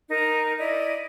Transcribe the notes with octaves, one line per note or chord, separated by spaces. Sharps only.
D#4 A#4
E4 D5 D#5